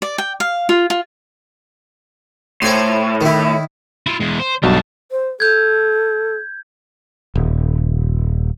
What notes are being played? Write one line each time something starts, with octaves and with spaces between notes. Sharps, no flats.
D5
G5
F5
F4
F4
A2 C5 G#5 C6
D#3 E4
E4 F4
E2 G#3
C5
B1 G2 G3 F#4 A5
C5
A4 G6 G#6
D#1